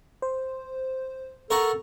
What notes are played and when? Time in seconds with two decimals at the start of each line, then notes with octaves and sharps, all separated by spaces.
0.22 C5
1.50 A4 A#4 F#5 C#6